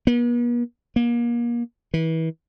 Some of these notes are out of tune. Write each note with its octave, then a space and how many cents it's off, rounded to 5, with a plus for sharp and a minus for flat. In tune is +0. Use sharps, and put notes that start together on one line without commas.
B3 -45
A#3 +30
E3 -30